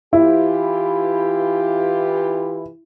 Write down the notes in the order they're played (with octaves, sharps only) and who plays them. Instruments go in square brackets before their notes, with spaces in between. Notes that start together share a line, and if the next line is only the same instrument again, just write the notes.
[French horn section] E3 F4 G4 [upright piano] E4